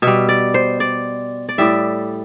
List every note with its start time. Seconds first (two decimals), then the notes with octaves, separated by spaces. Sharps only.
0.02 B2 G3 E5
0.29 D5
0.54 C5
0.80 D5
1.49 D5
1.58 A2 G3 E5